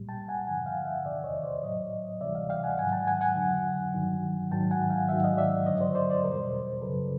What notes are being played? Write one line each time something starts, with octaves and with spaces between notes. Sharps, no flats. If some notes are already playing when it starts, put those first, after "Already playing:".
Already playing: C2 A#2 G3
G5 A5
F#5 G#5
G2 D3 F3 F#5 G#5
F5 G5
E5 F#5
E2 C3 D#3 D5 E5
C#5 D#5
C5 D5
A2 F#3 C#5 D#5
D2 C3 E3 G3 D5 E5
D#5 F5
F5 G5
F#5 G#5
G#2 D#3 F#3 F#5 G#5
G5 A5
F#5 G#5
F#5 G#5
F2 D3 F#3
G2 D#3 F#3
G#2 D#3 F#3 G5 A5
F#5 G#5
F5 G5
G#2 D#3 F#3 E5 F#5
D#5 F5
D5 E5
G2 D3 F#3 C#5 D#5
C5 D5
C5 D5
C5 D5
E2 B2 G3 A#4 C5
F#2 C#3 F#3 A4 B4